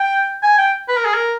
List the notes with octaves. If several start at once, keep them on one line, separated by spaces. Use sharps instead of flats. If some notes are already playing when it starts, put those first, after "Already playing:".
Already playing: G5
G#5
G5
B4
A#4
G#4
A#4